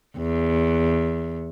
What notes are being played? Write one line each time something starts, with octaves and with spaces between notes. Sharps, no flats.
E2